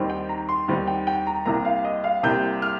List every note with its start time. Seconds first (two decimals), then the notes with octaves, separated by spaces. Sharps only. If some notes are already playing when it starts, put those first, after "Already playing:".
Already playing: D#2 D#3 G3 C4
0.10 G5
0.29 A#5
0.49 C6
0.68 D#2 D#3 G3 C4
0.87 G5
1.07 G5
1.27 A#5
1.45 C2 C3 G3 A#3 A#5
1.65 F5
1.84 D#5
2.04 F5
2.23 C2 C3 G3 A#3 G6
2.62 F6